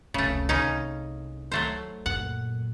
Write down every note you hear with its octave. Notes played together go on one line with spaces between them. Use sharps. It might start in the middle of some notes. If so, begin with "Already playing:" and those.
F1 C#2 C#3 A3
C2 C#3 C#4 D#4
F#3 A3 C5
F#2 A#2 F#5